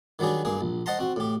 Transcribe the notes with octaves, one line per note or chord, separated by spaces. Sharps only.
D#3 F#3 G3 D4 G#4
G2 A#3 G#4
A#1
C5 D#5 F#5 A5 A#5 C6
C4 F#4
A2 G4